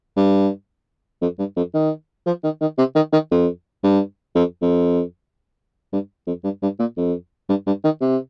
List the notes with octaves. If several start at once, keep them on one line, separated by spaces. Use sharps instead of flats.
G2
F2
G2
F2
D#3
F3
D#3
D#3
C3
D#3
D#3
F2
G2
F2
F2
G2
F2
G2
G2
A#2
F2
G2
G2
D#3
C3